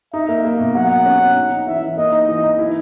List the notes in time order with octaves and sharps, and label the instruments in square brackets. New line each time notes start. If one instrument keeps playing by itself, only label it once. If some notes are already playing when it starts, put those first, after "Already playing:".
[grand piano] D#4 [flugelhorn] E5
[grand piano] A#3
A#3
B2
[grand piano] F#3 [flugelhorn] F#5
[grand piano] F#3
C#4
C#4
D#4
D#4
[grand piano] E3 [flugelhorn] E5
[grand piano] E3
[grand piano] A#3 [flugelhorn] D#5
[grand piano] D#4
[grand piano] E3 [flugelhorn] D#5
[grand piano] D#4
E4